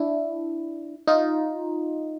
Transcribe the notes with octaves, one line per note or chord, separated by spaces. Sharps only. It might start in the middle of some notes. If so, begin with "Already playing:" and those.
Already playing: D4 E4
D#4 F4